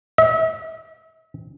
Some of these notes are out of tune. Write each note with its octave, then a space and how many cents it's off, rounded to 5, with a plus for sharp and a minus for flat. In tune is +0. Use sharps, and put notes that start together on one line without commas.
E5 -40